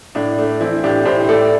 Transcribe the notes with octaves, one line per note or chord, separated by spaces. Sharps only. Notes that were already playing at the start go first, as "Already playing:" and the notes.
A2 D4
A3 D4
E3 C4 E4
A2 D4 G4
A2 G4 C5
A3 A4 D5